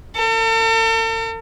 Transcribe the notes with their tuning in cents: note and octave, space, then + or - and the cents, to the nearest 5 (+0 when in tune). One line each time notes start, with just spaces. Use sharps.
A4 +45